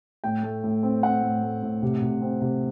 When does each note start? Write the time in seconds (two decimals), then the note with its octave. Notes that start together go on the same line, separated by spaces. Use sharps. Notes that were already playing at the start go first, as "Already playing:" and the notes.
0.24 A2 G5
0.43 A3
0.64 A2
0.83 C4
1.03 C4 F#5
1.23 A2
1.43 A3
1.63 A2
1.82 C3
2.02 C3
2.22 C4
2.41 C3